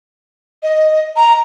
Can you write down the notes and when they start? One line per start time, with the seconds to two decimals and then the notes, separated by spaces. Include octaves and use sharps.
0.63 D#5
1.16 A#5